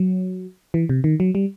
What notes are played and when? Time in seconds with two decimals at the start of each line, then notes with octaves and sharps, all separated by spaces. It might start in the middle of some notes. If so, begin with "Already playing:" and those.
Already playing: F#3
0.74 E3
0.89 C3
1.04 D#3
1.20 F#3
1.35 G3